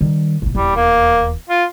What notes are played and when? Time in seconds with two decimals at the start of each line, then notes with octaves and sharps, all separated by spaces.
0.01 D#3 G3
0.42 A1 A#2
0.55 D#1 E2 G3
0.76 A#3
1.50 F4